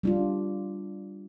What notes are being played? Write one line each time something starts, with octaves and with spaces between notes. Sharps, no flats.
G3 D4 F4